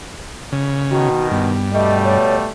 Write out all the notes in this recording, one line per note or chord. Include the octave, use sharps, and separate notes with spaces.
C#3
B2 D#3 F#4
G2 B3
B2 G3 A3 D#5
C#5